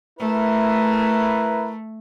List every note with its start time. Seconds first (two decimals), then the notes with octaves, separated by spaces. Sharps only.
0.20 A3 E4 A#4 B4